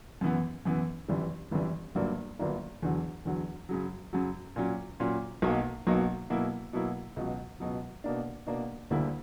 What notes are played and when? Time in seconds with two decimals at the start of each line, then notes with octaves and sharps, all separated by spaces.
0.21 F#2 E3 B3
0.65 F#2 E3 B3
1.08 G1 F#2 E3 G3
1.51 G1 F#2 E3 G3
1.95 G1 G2 F#3 A#3 D4
2.39 G1 G2 F#3 A#3 D4
2.82 E2 D3 F#3
3.25 E2 D3 F#3
3.69 F#2 C#3 F#3
4.13 F#2 C#3 F#3
4.56 A#2 F#3 C#4
5.00 A#2 F#3 C#4
5.42 B1 B2 F#3 A#3
5.87 B1 B2 F#3 A#3
6.30 B2 F#3 A#3 E4
6.73 B2 F#3 A#3 E4
7.16 C#2 B2 F#3
7.60 C#2 B2 F#3
8.04 B2 A#3 D4
8.47 B2 A#3 D4
8.90 D2 D3 G3 A#3 E4